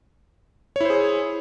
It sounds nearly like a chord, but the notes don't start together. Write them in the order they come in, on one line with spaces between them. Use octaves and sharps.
C#5 E4 C5 G#4